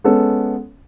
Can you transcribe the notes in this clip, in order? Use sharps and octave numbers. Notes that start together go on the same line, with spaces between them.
G#3 B3 C#4 A4